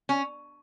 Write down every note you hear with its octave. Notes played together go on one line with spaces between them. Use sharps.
C#4